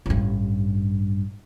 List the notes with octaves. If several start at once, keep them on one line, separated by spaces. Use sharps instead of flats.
A1 G2